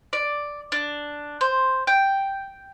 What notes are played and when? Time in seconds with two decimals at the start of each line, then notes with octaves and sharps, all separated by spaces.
0.13 D5
0.72 D4
1.41 C5
1.87 G5